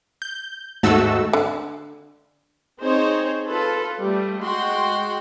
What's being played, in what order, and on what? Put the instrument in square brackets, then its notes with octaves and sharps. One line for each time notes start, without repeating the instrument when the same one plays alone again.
[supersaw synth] G6
D#2 G#2 A3 F#4 A4 E6
[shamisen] D3
[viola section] C4 D#4 G#4 C5 C#5
F4 A4 B4
G3 A3
G#3 F#4 G5 C6